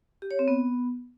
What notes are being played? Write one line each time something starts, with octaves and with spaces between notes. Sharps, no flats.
G4
C#5
C4
B3